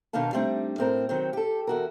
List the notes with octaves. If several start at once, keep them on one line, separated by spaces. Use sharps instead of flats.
B2 D#3 D4 D#4 F5 A5
G3 A3 C4 D4 D#4
A2 C4 A#4
D#3 F#3 C4
G4 A4
E2 F#4 A#4